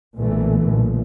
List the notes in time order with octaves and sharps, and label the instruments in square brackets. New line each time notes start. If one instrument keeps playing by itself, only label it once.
[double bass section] B1 A#2 D3 E3 A3
B1 A#2